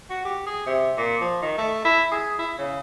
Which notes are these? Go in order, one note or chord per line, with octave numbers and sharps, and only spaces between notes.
F#4
G4
G#4
C3
A#2
F3
D#3
A3
E4
G#4
E4
C#3